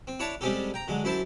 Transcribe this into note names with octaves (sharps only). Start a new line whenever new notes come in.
C4
D4 E4 C#5 A5
G3 G#3 C4 C#4 G4 A4
G5 A#5
D3 F#3 G#3
F#2 E4 C5 A5